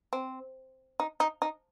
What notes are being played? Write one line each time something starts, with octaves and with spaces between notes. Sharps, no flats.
C4
D#4
D#4
D#4